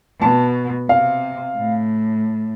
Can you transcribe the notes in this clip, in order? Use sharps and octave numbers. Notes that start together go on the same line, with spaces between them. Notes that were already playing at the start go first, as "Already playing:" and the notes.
B2 A5
C3 F5
A2